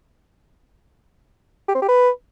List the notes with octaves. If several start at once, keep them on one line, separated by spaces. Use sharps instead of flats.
G4
C4
G4
B4